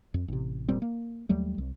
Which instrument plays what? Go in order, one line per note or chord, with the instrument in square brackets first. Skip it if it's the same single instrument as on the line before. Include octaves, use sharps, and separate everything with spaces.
[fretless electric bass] F2
A1 C3
F1 A#2 G3 C4
A#3
D#2 F#3 G3 A3
C2